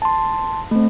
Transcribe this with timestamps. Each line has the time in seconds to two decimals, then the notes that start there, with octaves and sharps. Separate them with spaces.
0.02 A5 C6
0.71 A3 C4